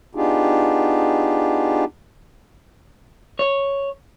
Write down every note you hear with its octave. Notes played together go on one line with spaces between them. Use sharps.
B3 D4 D#4 F4 G4 G#4
C#5